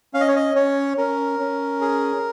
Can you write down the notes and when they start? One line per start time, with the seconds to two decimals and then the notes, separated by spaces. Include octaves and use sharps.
0.14 C#4 F5
0.20 D#5
0.28 C#5
0.36 D#5
0.55 C#4 C#5
0.97 C#4 A#4
1.40 C#4
1.81 G#4